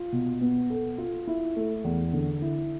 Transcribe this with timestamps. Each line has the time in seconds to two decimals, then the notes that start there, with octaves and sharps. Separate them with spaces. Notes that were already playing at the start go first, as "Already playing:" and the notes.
Already playing: F4
0.12 B2
0.41 B3
0.70 A4
0.98 F4
1.27 E4
1.56 A3
1.84 E2
2.13 D3
2.42 E4